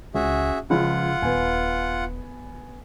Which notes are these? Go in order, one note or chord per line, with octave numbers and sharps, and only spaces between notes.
C#2 C#4 F#4 G#4 E5
C#2 C#3 F3 F4 F#5
D#1 B3 G#5